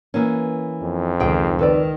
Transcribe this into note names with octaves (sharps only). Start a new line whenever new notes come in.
E3 A#3 C#4
F2
C#2 D#3 G#4 C5 G5
D#3 A4 B4 D5